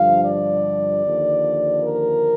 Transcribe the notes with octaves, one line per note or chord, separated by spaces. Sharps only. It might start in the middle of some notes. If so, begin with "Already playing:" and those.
Already playing: G2 D3 F3 F5
D5
D#2 D3 F3
A#4